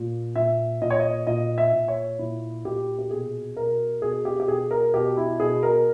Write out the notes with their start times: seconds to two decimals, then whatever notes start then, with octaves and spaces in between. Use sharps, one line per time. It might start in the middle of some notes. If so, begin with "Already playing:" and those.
Already playing: A#2
0.36 A#2 E5
0.82 A#2 D#5
0.90 C#5
1.00 D#5
1.27 A#2 D#5
1.58 E5
1.73 A#2
1.88 C#5
2.19 A#2 E4
2.65 A#2 G4
2.99 G4
3.11 B2 G#4
3.56 B2 A#4
4.02 B2 G#4
4.25 G4
4.40 G4
4.48 B2 G#4
4.71 A#4
4.94 B2 G4
5.17 E4
5.40 B2 G#4
5.63 A#4